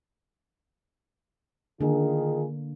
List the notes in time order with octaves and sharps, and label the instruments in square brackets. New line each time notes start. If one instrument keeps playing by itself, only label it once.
[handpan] D3 A#3 [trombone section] D#3 F4 G#4